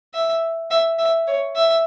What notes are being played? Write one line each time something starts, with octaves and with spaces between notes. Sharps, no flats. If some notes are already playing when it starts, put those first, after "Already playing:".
E5
E5
E5
C#5
E5